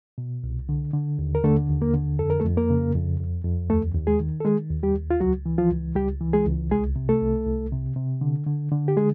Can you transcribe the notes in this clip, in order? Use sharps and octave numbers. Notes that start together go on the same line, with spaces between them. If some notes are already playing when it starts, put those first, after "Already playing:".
B2
C2
D3
D3
D#2
A#4
D3 A3 A4
D#2
A#3 A#4
D3
F2 A4
A#4
A3 A4
F2
A#3 A#4
C#3
F2
F2
F2
D#2 A3 A4
D#2
G#3 G#4
D#3
A4
D#3 G#3 G#4
D#2
G3 G4
D#2
F4
C#2 F#3 F#4
E3
F3 F4
C#2
C#2 G3 G4
E3
G#3 G#4
C#2
C2 G#3 G#4
C3
A3 A4
C2
C2
C3
C3
D3
D3
D3
G4
G#3 G#4